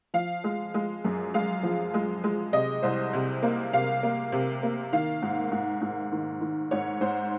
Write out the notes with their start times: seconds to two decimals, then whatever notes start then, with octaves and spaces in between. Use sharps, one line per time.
0.14 F3 F5
0.44 G#3
0.74 G#3
1.04 F#2
1.34 G#3 F5
1.63 F3
1.94 G#3
2.24 G#3
2.53 C3 D#5
2.82 C2 C5
3.13 C3
3.43 A#3
3.73 C3 F5
4.03 A#3
4.32 C3
4.63 A#3
4.93 D#3 F5
5.22 G#2
5.52 G#2
5.81 G#2
6.12 D#3
6.41 D#3
6.71 G#2 C#5
7.01 G#2 C5